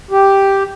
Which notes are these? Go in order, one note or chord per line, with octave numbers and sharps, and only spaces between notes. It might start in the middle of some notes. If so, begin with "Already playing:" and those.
G4